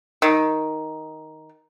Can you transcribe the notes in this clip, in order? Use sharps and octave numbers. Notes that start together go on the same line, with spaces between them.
D#3